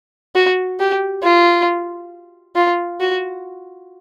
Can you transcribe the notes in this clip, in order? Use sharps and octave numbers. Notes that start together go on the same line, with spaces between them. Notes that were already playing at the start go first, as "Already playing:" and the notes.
F#4
G4
F4
F4
F#4